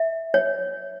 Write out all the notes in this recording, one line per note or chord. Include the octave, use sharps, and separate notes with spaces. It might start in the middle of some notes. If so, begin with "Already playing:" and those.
Already playing: E5
C#5